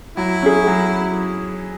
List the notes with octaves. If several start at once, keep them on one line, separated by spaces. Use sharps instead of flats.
F#3 E4
C#4 G#4
F#3